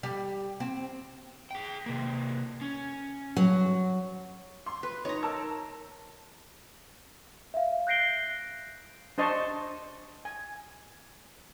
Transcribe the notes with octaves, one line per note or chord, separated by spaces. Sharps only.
G3
C4
G#4 G5
C3 A#3
C#4
F#3
C6
B4
D#4 C#5 A#5
A#4 A5 E6
E5 F5
F#6 G6 A#6 C7 D7 G7
D4 C5 D#5 A5 C6 C#6
G#5